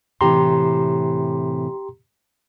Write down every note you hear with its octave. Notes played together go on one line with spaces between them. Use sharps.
A2 C3 E3 G4 A#5 C6